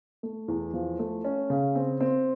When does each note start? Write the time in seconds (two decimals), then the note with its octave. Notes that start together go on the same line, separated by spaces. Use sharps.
0.23 A3
0.48 E2
0.73 F3
0.99 A3
1.24 C#4
1.50 C#3
1.75 C4
2.01 C4